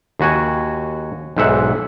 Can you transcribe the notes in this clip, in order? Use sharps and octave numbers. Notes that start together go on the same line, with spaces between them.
D#2 F#4 G#5
B1 G#2 E5 F#5